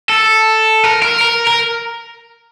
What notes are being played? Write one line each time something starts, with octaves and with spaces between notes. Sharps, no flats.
A4
A#4
A#4
A#4
A#4